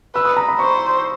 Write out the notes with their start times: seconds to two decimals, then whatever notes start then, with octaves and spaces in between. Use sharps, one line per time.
0.15 B4 E6
0.25 D#6
0.37 A#5
0.48 B5
0.59 C5 C#6